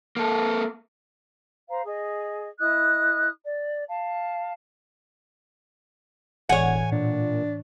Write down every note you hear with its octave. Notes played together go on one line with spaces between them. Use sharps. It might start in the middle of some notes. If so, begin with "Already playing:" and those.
A#3 A4
C5 F5 A#5
G#4 D#5
E4 D#5 D#6 F#6
D5
F5 A5
E1 A2 E3 C#5 F#5 G#5
A#2 D4